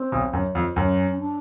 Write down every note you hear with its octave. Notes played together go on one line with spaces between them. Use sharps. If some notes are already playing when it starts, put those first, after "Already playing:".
Already playing: C4
B1 B2
F#2
F2
F#2 C#4
C#4
D4